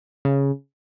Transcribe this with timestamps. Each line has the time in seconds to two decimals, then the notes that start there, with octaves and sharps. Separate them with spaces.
0.25 C#3